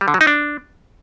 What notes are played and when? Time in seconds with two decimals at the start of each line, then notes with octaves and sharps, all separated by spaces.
0.01 G3
0.08 D3
0.14 F#3
0.21 D#4
0.27 D4